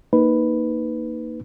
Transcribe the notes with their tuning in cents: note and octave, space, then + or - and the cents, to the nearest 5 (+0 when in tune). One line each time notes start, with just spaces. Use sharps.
A#3 +0 D#4 +0 B4 +0